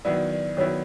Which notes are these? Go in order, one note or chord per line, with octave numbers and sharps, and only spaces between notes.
D#3 F#3 B3 E4 D5
D5
D#3 F#3 B3 E4 C#5